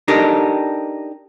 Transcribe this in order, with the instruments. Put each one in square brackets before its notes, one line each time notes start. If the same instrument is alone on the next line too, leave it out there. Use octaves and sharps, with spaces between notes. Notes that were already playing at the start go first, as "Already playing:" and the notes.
[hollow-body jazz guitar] D4 D#4 G4 A4 A#4